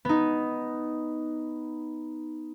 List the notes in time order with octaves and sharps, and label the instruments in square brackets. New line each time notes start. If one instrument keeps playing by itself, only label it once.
[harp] B3 D#4